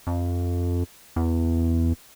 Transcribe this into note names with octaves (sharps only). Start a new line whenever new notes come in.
F2
E2